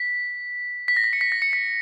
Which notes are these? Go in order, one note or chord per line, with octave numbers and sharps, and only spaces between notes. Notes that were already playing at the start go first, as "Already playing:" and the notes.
Already playing: B6
B6
A#6
B6
C#7
B6
A#6
C#7
B6